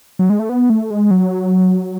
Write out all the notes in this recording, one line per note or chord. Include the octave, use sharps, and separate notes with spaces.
F#3
G#3
A3
B3
A3
G#3
F#3